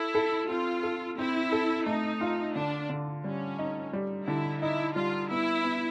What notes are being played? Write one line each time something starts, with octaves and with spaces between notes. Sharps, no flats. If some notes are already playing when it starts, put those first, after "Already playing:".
Already playing: E4 A4
A4
C4 F4
A4
C4 E4
A4
A3 D#4
F4
D3 D4
D3
G3 C#4
D#4
G3
D3 E4
D#4 E4
G3 F4
B3 E4
B3